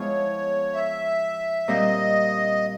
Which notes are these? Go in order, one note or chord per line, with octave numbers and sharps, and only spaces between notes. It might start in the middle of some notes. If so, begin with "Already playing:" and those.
Already playing: F3 G#3 B3 E4 C#5
E5
A#2 G3 C4 D#5